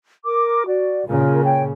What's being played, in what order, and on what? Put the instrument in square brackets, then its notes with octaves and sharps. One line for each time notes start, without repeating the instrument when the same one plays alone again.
[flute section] A#4 D6
F#4 D5
[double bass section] A#2 C#3 [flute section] F4 A#4
[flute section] C#5 G5